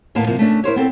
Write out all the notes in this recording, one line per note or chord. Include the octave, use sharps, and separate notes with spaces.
D#2 A2 A#3 B3 B4 A5
C3 F3 A#3
A3 C#4 D4
E4 A#4 C5 C#5
B3 C4 A4